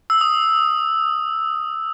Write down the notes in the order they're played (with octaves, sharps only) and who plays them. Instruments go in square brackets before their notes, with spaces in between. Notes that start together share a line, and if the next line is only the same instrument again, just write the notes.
[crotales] E6
D#6